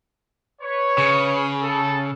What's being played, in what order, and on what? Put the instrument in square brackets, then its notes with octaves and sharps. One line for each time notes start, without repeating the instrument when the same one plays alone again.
[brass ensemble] B4 C#5
[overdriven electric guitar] C#3
[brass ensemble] A4